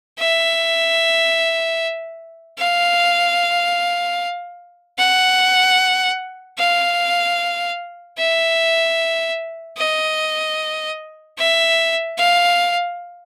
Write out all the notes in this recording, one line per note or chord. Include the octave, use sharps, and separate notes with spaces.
E5
F5
F#5
F5
E5
D#5
E5
F5